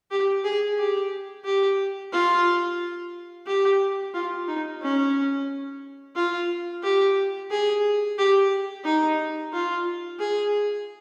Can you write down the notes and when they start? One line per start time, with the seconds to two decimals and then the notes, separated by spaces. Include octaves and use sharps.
0.11 G4
0.44 G#4
0.78 G4
1.45 G4
2.13 F4
3.47 G4
4.14 F4
4.48 D#4
4.82 C#4
6.16 F4
6.83 G4
7.51 G#4
8.18 G4
8.85 D#4
9.53 F4
10.19 G#4